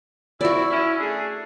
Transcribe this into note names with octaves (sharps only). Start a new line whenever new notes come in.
E4 F#4 D5
C#4 E4
A3 D4 G#4